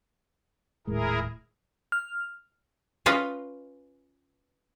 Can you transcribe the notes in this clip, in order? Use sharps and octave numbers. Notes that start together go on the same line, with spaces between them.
D#1 A2 G#3 E4 G#4 A#4
F6
C#4 F4 B4 D#5